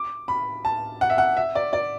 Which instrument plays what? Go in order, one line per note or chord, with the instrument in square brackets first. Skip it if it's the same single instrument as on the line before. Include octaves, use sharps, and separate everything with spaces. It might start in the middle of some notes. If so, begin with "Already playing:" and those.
Already playing: [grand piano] D6
B5
A5
F#5
E5
F#5
E5
D5
D5